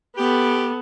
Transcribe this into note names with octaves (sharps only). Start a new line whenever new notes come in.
B3 G4 A4